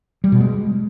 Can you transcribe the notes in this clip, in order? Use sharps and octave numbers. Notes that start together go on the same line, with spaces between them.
G3
B2
G#3